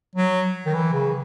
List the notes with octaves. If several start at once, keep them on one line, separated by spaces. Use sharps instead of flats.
F#3
D#3
E3
C#3